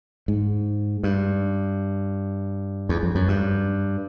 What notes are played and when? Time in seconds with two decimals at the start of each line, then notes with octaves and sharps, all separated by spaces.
0.28 G#2
1.03 G2
2.89 E2
3.03 F2
3.15 F#2
3.28 G2